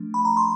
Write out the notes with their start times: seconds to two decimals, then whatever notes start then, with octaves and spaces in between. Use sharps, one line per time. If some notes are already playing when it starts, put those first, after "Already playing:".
Already playing: F3 A3 D4
0.14 B5
0.25 A#5
0.37 C6